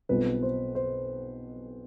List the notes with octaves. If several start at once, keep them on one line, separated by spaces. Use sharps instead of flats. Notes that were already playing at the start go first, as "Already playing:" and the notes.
B1 B2 G3 C4 F4 B4
C5
C5